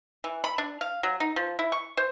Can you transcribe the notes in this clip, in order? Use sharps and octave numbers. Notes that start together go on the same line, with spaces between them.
E3
B5
D4
F5
F#3
D#4
F3
E4
C#6
C5